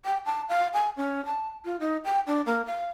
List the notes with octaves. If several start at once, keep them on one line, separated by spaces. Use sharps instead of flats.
G5
A5
F5
G#5
C#4
A5
F4
D#4
G5
D4
A#3
F5